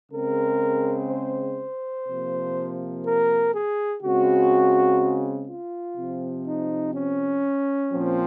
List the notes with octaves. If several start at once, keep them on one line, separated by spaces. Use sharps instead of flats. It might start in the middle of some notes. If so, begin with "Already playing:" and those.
C#3 G#3 C4 A#4
C5
C3 F3 A#3
A#4
G#4
C#3 G#3 C4 F#4
F4
C3 F3 C4
D#4
C#4
A#2 F3 C4